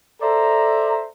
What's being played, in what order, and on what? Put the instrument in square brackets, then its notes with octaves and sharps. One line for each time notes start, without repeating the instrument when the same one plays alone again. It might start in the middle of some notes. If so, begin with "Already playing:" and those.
[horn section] A4 C5 D5 E5 A#5